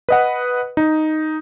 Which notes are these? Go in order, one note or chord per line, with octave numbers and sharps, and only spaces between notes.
B4 D#5 F#5
D#4